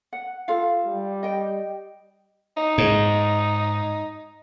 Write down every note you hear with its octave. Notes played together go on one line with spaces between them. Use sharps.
F#5
F4 A4 F5
G3
D#5 G5
D#4
G#2